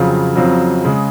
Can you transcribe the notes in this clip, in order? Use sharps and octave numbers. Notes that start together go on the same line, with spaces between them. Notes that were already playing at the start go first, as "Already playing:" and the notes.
Already playing: F2 C#3 F#3 C4 F4
F2 C#3 F#3 C4 F4
C#3 G#3